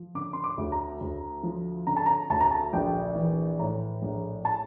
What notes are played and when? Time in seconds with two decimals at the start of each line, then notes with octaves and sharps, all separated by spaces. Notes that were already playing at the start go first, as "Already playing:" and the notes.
Already playing: F3
0.15 D3 D6
0.33 C6
0.44 D6
0.58 D2
0.72 A#5
1.01 D2
1.43 F3
1.87 D3 A#5
1.97 A5
2.06 A#5
2.30 D2 A5
2.41 A#5
2.51 A5
2.73 A#1 G5
3.15 E3
3.59 A2 A#5
4.02 A#1
4.45 A5